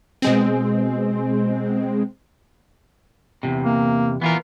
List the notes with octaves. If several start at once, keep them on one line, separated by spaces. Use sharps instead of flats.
B2 G#3 C4
E2 G#2 C3
A#3
E3 B3 F4 A#4